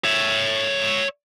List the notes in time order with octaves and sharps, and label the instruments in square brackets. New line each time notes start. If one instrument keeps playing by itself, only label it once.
[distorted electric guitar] C#5 E5